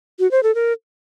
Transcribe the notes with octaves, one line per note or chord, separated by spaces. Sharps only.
F#4
C5
A4
A#4